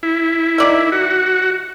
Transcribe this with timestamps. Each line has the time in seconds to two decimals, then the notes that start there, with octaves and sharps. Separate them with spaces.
0.03 E4
0.58 D#3 D5 E5
0.92 F#4